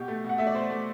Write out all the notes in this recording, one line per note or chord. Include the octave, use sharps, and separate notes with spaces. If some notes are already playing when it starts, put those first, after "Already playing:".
Already playing: B2 G4
A3
B2
F#5
A3 E5
D5
B2 C5
A3